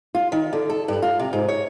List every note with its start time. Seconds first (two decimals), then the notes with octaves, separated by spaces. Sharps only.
0.15 F4
0.32 D#3
0.53 D3
0.70 A4
0.88 G2
1.02 F4
1.20 C3
1.33 G#2
1.48 C#5